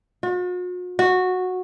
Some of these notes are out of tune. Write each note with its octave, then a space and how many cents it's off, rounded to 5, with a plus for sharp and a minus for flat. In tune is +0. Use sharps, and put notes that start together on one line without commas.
F#4 -45
F#4 -10